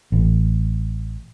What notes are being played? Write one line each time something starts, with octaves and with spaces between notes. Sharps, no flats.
A1